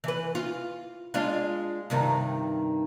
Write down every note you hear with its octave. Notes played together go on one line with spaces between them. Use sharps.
E3 B4
F4
G#3 D4 F4
G2 C3 D#3